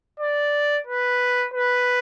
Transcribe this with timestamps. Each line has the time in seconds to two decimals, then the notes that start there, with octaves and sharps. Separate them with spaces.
0.20 D5
0.87 B4
1.54 B4